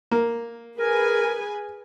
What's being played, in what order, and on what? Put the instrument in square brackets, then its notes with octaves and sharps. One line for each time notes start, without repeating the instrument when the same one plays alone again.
[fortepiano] A#3
[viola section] G#4 B4 G#5 [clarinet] A#4